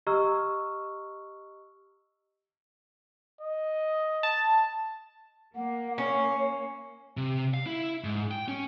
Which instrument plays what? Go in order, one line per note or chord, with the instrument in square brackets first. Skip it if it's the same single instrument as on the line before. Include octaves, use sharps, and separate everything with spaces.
[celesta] G4 D#5 A#5 C#6 E6 F6
[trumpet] D#5
[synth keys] A5
[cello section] A#3 [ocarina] F#5
[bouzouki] C#4 [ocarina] C#5
[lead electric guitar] C3
F5
E4
G#2
G5
C#4